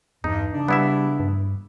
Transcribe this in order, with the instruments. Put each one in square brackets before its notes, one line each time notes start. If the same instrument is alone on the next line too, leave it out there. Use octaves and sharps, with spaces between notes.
[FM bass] E2 [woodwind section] G2 [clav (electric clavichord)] D#4
[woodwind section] C#3 D4
[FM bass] G3 [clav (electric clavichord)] B3 E4 E5
[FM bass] G2